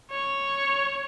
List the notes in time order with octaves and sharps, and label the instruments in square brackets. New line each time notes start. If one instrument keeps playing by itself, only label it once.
[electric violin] C#5